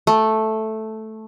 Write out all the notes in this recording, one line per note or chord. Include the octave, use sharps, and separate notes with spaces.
A3